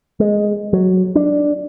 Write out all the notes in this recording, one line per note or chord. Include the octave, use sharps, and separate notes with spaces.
G#3
F#3
D4